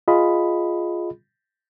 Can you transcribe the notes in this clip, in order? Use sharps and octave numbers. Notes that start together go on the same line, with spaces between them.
F4 G#4 D#5 B5